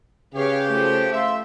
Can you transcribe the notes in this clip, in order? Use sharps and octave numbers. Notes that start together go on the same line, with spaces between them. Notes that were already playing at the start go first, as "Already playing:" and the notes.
C#3 G4 G#4 B4 C#5 F5
F3 A3
E5 F5 C6